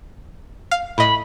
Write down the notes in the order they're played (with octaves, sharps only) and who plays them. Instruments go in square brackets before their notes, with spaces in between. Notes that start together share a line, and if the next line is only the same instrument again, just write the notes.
[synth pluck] F5
[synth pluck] A2 D#5 [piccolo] B5